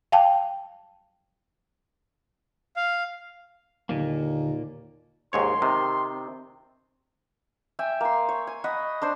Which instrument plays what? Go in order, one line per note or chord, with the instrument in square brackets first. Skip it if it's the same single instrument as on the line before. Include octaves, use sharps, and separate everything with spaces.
[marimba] F5 G5 A5
[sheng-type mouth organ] F5
[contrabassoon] D#2 [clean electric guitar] A#2 A#3 [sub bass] D3
[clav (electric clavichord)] D#2 G#2 C#5 [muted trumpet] C6
[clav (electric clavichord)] C3 D#3
[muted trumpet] C4
[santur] E5 G5 G#5
A#3 C6
C#5
G#5
D#5 F#5 B5
D4 C5 C6